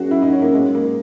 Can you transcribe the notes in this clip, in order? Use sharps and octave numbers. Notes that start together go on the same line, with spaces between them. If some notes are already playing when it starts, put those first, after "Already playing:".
Already playing: F#2 F#4 G#4
E4
D#4
C#4
A#3
G#3
A#3